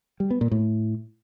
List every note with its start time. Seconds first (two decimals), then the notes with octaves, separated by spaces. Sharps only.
0.20 G3
0.31 B3
0.41 A#2
0.51 A2